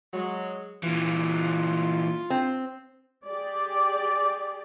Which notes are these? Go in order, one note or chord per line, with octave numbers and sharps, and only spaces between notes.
F#3 G#3
A#2 E3 F4
C4
G4 G#4 D5